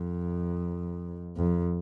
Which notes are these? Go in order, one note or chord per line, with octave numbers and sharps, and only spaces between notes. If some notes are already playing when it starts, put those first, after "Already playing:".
Already playing: F2
F2